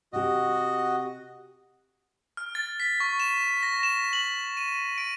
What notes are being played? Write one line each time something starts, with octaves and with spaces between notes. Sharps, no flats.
C3 F#4 G4 D#5
F6
A6
B6
C#6
E7
A#6
E7
F#7
D#7
D7